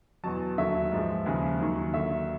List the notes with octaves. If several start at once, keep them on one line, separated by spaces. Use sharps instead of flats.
E2 B2 F#3 A5
D#2 D3 F#3 E5
G#2 F3 G#3
D#2 C#3 F3 G#3
D#2 D#3 F#3
D#2 D3 F#3 E5